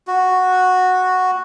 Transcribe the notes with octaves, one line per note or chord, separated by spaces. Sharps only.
F#4